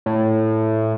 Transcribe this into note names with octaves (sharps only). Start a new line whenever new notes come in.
A2